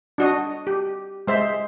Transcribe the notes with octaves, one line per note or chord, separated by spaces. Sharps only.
D4 F#4 D#5
G4
G#3 C5 E5